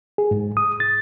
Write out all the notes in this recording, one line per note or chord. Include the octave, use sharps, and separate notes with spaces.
G#4
G#2
D#6
A6